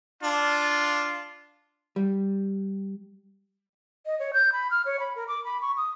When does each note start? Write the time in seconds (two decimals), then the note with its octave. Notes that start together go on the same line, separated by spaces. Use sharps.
0.23 D4 F4
1.96 G3
4.06 D#5
4.19 C#5
4.33 G6
4.52 B5
4.71 F6
4.86 C#5
5.00 B5
5.16 A#4
5.28 D6
5.44 B5
5.62 C#6
5.77 D#6